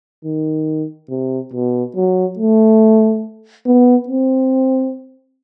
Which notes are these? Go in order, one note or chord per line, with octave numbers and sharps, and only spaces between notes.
D#3
C3
B2
F#3
A3
B3
C4